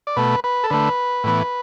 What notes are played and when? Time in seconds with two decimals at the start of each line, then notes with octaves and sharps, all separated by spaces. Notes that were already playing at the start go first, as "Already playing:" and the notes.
0.07 D5
0.17 B2 A3 B4
0.44 B4
0.64 A4
0.70 D3 A3 B4
1.24 A2 E3 B3